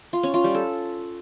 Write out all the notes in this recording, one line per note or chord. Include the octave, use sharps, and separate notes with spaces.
F4
C#4
F4
G3
A4